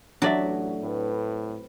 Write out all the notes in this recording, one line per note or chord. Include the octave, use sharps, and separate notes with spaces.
A1 A2 F#3 D4 D5 E5
A2 C4 B4